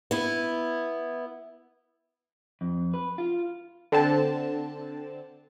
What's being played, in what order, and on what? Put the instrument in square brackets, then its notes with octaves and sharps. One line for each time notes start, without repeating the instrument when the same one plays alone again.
[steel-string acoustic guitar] B3 E4
[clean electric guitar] F2
B4
F4
[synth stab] D3 C4 A5